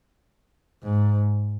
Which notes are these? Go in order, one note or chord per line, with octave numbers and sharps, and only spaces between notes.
G#2